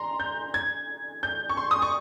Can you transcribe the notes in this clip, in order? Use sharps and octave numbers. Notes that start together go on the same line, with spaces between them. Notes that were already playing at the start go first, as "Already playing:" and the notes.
Already playing: A#5 C6
G6
G#6
G6
C#6
C6
D#6
C#6